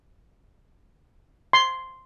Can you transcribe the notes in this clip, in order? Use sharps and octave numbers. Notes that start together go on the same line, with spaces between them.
C6